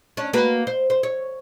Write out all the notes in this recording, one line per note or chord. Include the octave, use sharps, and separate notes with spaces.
C#4 D4
A#3 F#4 B4
C5
C5
C#5